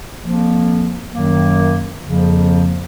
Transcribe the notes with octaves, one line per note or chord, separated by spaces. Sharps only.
F2 F3 A#3
F#2 D#3 F#3 A#3
F2 C#3 F3 A#3